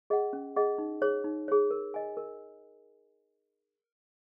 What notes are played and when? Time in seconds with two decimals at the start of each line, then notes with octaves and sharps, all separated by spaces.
0.10 G#4 D#5 F#5
0.33 C#4
0.56 G#4 D#5 F#5
0.78 D#4
1.02 G#4 C#5
1.24 D#4
1.48 G#4 C#5
1.71 A#4
1.94 D#5 G#5
2.17 A#4